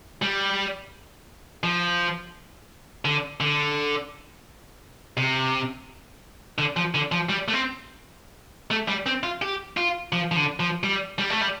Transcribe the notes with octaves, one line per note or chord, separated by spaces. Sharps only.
G3
F3
D3
D3
C3
D3
F3
D3
F3
G3
A3
C4
A3
G3
C4
F4
G4
F4
F3
F3
D3
F3
G3
G3
A3
G3